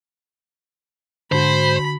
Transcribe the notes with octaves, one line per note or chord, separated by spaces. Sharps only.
G#2 D3 F#4 C5 B5